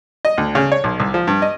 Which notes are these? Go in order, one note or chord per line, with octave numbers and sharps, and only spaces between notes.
D#5
D2
C#3
C#5
B1
C2
F3
G2
D#5